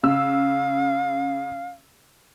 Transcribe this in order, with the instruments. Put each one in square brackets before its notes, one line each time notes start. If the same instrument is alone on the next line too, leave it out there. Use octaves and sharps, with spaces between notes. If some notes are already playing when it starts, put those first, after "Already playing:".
[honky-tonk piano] C#3 E6 [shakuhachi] F5